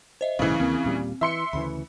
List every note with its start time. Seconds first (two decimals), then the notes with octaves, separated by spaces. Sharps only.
0.21 C5 D#5 E5
0.39 B1 A2 C#3 E3
0.60 D#2 A#3 C4
0.84 D#1 A#2 G3
1.21 E3 E5 C6 C#7
1.53 D2 C#3 E3 B5